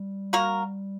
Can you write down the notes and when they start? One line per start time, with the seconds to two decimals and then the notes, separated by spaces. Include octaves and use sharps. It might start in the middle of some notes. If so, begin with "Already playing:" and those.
Already playing: G3
0.33 A#3 F#4 A#4